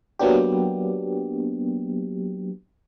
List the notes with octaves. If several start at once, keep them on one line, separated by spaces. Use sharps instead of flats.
F#3 A#3 B3 D4 G4